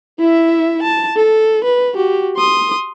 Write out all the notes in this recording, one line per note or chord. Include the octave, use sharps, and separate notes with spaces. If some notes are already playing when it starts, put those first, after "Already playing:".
E4 E5
A5
A4
B4
F#4 G4
C6 D#6